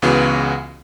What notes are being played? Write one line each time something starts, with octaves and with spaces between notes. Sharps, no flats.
C#2 C#3 E3 B3 F#4